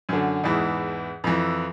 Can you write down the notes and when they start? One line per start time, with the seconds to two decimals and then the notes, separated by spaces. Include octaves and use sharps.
0.09 F#2 D3
0.44 E2 G#2 E3
1.24 F2 E3